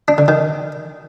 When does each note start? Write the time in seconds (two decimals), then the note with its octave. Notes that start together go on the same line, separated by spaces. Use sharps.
0.08 D4
0.18 D3
0.28 D#3